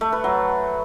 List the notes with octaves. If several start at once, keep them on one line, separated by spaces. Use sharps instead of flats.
A3
B4
F#3